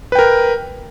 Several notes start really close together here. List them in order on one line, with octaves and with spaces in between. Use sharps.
B4 G5 A#4